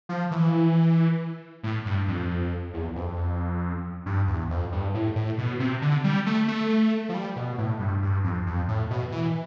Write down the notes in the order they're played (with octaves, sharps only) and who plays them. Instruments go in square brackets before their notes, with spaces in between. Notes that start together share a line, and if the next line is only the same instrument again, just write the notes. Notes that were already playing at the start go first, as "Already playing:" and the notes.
[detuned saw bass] F3
E3
A2
G2
F2
E2
F2
G2
E2
F2
G2
A2
A2
B2
C3
D3
G3
A3
A3
F3
G3
B2
A2
G2
G2
F2
F2
A2
B2
E3